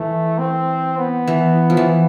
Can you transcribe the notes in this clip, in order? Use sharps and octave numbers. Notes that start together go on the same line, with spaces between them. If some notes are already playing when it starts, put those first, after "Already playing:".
Already playing: E3 A3
C4
B3
E3
F3
E3